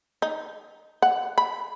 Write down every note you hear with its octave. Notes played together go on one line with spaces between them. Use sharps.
D#4
F#5
B5